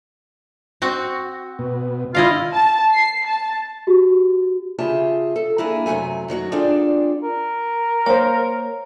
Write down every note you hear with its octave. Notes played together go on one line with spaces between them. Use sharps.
C4 F#4
B2
D3 E4 F4 D#5 F5
A5
C7
A5
F#4 G4
C#3 F4 G4 G#4 E5 A5
A4
A#3 D4 E4 G#4 G#5
F#2 C3 F#3 A3 G#5
F#2 D#3 F#3 F#4
C4 D4 F4 G#4 A4 D5
A#4
A#3 C5 C#5